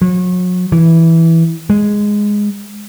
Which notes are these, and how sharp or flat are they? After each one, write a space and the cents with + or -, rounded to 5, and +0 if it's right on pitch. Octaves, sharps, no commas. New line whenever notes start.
F#3 -35
E3 -5
G#3 -5